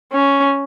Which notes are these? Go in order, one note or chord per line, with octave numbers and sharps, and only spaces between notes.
C#4